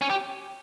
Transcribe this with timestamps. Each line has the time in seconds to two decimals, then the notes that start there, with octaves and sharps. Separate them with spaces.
0.01 C#4
0.10 G4